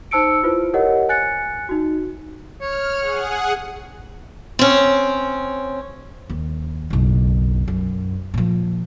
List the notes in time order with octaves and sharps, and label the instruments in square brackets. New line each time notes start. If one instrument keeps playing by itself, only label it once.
[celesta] D#4 C5 A5 E6 C#7 D7
E4 F4 B4 C5
G4 A#4 C#5 D#5 F#5
G#5 F#6 A6 C#7
D#4 F#4
[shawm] C#5 [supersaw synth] F6
[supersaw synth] G#4 F#5
[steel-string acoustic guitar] C4 C#4
[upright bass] D#2
F#1 B1
F#2
A#2 F3